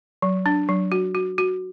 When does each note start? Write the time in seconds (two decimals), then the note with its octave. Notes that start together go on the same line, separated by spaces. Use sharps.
0.22 F#3
0.46 D4
0.69 F#3
0.92 F#4
1.15 F#4
1.38 F#4